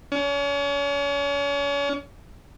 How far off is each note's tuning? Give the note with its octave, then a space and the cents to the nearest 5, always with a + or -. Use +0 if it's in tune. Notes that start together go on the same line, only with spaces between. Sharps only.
C#4 +35